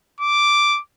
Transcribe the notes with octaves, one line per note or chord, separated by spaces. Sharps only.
D6